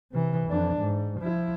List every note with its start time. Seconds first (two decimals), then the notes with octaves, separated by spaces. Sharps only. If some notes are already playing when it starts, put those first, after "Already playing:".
0.12 C3 E3
0.48 F2 D4
0.80 G#2
1.21 F3 E4